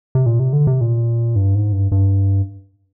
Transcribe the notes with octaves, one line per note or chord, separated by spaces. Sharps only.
C3
A#2
C3
D3
C3
A#2
G2
G#2
G2
G2